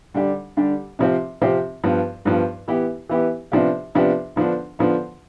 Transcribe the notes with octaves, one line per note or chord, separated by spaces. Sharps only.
D3 G3 D4 G4
D3 G3 D4 G4
C3 F3 C4 G4
C3 F3 C4 G4
G2 F3 B3
G2 F3 B3
E3 B3 E4 G4
E3 B3 E4 G4
C3 F3 B3 D4 G4
C3 F3 B3 D4 G4
D3 F3 B3 D4
D3 F3 B3 D4